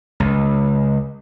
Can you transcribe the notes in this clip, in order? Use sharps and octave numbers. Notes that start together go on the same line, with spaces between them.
C#2